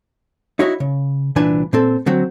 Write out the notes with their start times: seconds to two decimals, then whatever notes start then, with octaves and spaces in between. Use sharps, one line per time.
0.59 D#4 E4 F#4 C#5 E5
0.80 C#3
1.36 C2 A#2 E3 D4 B4 G#5
1.73 A#2 C4 A4
2.06 D3 F#3 C4 F#4